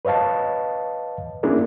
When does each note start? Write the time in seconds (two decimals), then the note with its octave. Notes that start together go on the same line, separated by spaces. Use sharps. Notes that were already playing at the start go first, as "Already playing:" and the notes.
0.05 B4 C#5 D#5 F5 A5
1.43 A#3 C#4 D4 E4 G#4 A#4